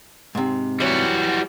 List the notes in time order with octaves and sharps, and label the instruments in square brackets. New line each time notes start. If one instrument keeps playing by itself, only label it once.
[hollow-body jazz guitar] G#2 C3
[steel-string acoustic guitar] E3 F#3 [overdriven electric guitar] G3 F#4